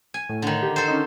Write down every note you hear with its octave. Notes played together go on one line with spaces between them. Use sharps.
G#5
A2
D3 D#3
G4
A4 C5
C#4 D#4